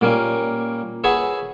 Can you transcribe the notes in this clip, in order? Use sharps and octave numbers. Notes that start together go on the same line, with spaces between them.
A#2 G3 A#3 C#4
F#4 G#4 B4 C#5 E5